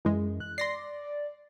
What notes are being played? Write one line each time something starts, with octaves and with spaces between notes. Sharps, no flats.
F#2 E3 G#3
F#6
D5 C6 A#6 C7